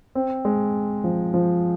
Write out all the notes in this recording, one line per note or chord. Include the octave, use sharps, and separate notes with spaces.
C4
G#3
F3
F3